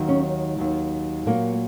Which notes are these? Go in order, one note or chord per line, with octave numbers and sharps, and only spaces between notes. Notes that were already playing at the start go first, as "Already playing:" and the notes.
Already playing: D#2 D#3 F#3
C#4
D#2 D#3 F#3
A#2 F#3 A#3